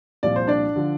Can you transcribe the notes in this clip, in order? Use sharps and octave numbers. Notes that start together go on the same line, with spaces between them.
C2 A#2 F3 D5
C5
D4 D5
D3 F3